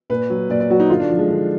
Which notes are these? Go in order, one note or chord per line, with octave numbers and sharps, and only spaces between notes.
A#2 B4
F#3
A#2 D5
D5
F#3 F#4
D#4
D3 F4
D4
F3
G#3
D3